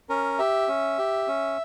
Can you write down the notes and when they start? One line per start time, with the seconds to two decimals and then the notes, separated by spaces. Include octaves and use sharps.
0.09 C#4 A#4
0.39 G4 E5
0.68 C#4
0.98 G4
1.28 C#4